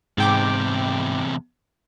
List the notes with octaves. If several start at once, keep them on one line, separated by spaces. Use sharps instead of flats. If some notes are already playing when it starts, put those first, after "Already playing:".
E2 G#2 C3 G5 D6